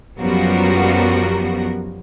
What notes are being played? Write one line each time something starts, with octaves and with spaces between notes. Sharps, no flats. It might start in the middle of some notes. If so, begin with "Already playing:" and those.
F#2 F3 G3 B3 F#4 A#4